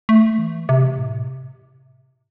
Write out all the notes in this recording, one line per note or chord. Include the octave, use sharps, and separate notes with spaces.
A3
E3
C3
A2